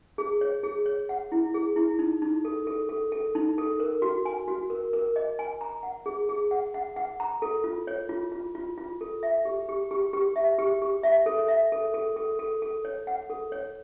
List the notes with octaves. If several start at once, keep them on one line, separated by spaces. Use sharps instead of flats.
G#4
C#5
G#4
C#5
F#5
E4
G#4
E4
D#4
D#4
A4
A4
A4
A4
D#4
A4
A#4
F#4
G#5
F#4
A#4
A#4
D#5
G#5
A#5
F#5
G#4
G#4
F#5
F#5
F#5
A#5
A4
F4
C#5
F4
F4
F4
F4
A4
E5
G4
G4
G4
G4
E5
G4
G4
E5
A4
E5
A4
A4
A4
A4
A4
C#5
F#5
A4
C#5